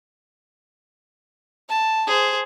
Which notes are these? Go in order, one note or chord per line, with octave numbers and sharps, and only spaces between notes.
A5
G#4 C5